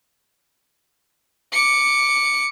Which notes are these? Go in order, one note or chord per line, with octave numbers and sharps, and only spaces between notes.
D6 C#7